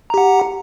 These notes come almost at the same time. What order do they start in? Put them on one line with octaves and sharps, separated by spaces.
A#5 G4 F#5